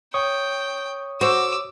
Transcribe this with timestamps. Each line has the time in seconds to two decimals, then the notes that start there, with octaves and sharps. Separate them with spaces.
0.14 C#5 G5 C#6 D#6
1.21 F#4 C5 D6 E6